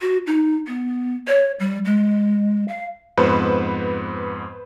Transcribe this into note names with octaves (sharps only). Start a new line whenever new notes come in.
F#4
D#4
B3
C#5
G3
G#3
F5
F2 G#2 B3 B4 C5